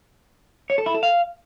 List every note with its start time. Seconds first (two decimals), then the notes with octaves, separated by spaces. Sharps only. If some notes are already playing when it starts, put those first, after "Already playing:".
0.70 C#5
0.78 A4
0.86 E4
0.94 A4
1.03 F5